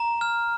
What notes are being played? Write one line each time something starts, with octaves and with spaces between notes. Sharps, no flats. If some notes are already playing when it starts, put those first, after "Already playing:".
Already playing: A#5
F6